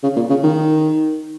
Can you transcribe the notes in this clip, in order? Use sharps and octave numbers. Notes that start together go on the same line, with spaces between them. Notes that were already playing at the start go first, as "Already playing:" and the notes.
C#3
A#2
C#3
D#3